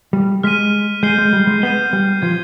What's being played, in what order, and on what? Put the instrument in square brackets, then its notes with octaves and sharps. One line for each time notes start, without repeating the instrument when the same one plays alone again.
[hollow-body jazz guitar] G3
[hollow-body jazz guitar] G#3 [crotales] F6 B6 D#7
[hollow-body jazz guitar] G#3 [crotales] G6 C7 D#7 G7
[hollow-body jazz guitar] G#3
G3
G#3
[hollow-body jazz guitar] B3 [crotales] G6 C7 D#7 G7
[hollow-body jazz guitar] G3
[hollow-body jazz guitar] F3 [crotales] G#6 C7 G7